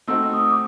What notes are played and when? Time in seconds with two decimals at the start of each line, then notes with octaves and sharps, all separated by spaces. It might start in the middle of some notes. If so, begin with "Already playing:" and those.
0.07 A3 C4 D#4 F#4 E6
0.33 D#6
0.51 D6